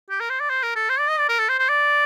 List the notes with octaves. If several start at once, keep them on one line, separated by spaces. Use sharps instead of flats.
G4
A#4
C5
D5
C5
A#4
A4
C5
D5
D#5
D5
A#4
A4
C5
C5
D5